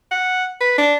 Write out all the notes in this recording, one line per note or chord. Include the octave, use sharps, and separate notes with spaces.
F#5
B4
D4